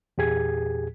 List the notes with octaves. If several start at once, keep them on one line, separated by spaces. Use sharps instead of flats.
E2 A#2 G4 G#4 G#6